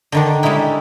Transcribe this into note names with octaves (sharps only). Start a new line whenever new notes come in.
D3 D#3 D4
G3 G#3 C#4 D#4 E4